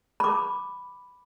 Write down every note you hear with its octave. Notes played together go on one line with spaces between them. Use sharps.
B5 D6